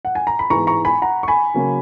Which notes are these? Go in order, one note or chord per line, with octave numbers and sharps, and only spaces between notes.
F#5
G#5
A#5
B5
G#2 E3 G#3 B3 A#5 C#6
A#5 C#6
G#5 B5
F#5 A#5
C#6
G#5 B5
C#3 F#3 A#3 C#4